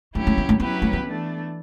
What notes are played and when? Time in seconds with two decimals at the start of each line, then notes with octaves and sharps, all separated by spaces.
0.15 F#3 A3 C#4 E4 G4
0.27 A3
0.38 B3
0.49 A3
0.60 F#3 B3 C#4 E4 G4 B4
0.82 A3
0.93 B3
1.05 E3 A3 D4